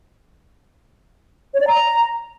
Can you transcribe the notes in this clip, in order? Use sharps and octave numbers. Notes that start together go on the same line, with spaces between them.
C#5
D5
A#5